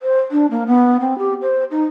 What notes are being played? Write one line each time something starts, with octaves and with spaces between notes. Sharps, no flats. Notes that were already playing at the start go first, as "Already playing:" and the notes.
C5
D4
A#3
B3
C4
G4
C5
D#4